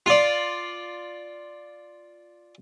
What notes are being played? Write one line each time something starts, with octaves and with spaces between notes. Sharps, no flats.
F4 D5